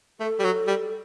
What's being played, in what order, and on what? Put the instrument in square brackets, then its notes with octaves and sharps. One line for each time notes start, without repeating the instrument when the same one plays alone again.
[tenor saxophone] A3 [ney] A4
[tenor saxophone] G3
F#3
G3